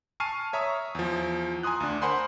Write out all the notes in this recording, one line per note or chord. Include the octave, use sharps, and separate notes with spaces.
G#5 A5 C#6 F6 C7 D#7
C#5 E5 A#5 C#6 D#6
E2 F3
G#5 A#5 C6 D#6 F#6
D2 D4
A#4 C5 F#5 G#5 B5 C6